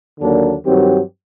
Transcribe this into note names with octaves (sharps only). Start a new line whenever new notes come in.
D#2 D3 F#3 A#3 D4
G2 D#3 F#3 C4 G4